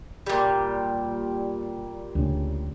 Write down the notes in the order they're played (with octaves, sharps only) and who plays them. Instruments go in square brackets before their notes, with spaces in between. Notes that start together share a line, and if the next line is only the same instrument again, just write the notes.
[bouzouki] A#2 G3
[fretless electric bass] D2 C#3